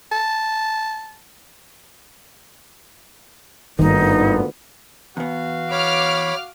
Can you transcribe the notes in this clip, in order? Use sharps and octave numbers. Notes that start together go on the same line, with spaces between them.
A5
G#1 D2 G2 A#2 D#3 B3 D#4
E2 B3 F#4 F5
C#5 B5 D6 F6